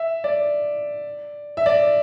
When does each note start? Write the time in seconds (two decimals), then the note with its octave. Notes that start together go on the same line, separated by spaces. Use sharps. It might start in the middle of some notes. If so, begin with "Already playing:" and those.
Already playing: E5
0.24 D5
1.57 E5
1.66 D5